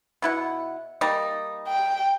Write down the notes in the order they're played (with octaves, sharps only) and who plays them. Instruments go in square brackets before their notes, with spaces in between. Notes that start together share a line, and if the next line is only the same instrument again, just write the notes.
[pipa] B2 E4 F#5
G3 A#3 D#4
[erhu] G5